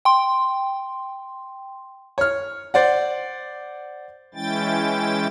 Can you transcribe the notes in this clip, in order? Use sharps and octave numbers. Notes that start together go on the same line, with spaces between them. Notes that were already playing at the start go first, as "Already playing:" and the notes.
G5 C6
C#5 F6
C5 D5 F#5
E3 G#3 C#4 E4 G5 A6